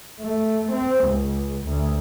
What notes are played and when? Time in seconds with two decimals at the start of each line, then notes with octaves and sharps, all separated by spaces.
0.21 A3
0.72 C4
1.05 C#2
1.65 D2